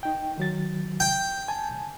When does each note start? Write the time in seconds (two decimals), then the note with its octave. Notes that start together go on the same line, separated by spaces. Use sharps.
0.03 D#4 G5
0.38 D#3 F#3 A6
1.00 G5
1.48 G#5 A5